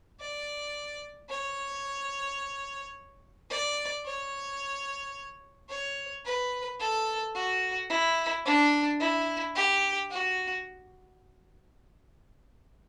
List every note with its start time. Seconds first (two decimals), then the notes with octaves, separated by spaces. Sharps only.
0.20 D5
1.29 C#5
3.50 D5
4.05 C#5
5.69 C#5
6.25 B4
6.80 A4
7.35 F#4
7.90 E4
8.45 D4
9.00 E4
9.55 G4
10.11 F#4